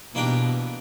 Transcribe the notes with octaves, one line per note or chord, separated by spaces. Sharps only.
B2 E3 A#3 D4 G4 A#4